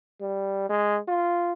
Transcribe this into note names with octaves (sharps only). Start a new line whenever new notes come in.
G3
G#3
F4